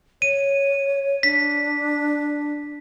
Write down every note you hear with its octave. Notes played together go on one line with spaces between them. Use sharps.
C#5 D#7
D4 B6